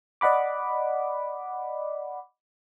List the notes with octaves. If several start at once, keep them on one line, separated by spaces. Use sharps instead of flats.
D5 D#5 F#5 B5 D6